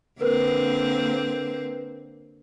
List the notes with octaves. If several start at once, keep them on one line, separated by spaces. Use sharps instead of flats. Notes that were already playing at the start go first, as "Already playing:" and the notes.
D3 A#3 C4 A#4 B4